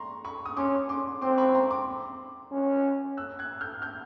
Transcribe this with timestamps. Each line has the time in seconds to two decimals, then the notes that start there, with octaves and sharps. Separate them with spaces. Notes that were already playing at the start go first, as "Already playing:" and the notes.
Already playing: A#5 C6 C#6
0.24 B5 C#6
0.46 D#6
0.57 C#4 C6 D6
0.89 C6 D6
1.22 C4 C6 D6
1.38 B5 C#6
1.55 A#5 C6
1.71 C6 D6
2.52 C#4
3.17 E6 F#6
3.39 F#6 G#6
3.61 F6 G6
3.82 F6 G6